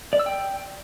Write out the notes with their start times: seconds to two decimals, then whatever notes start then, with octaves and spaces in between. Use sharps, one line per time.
0.13 D5
0.19 E6
0.26 G5